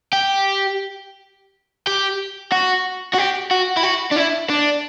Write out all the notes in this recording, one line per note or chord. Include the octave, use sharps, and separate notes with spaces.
G4
G4
F#4
F#4
G4
F#4
E4
F#4
D4
E4
D4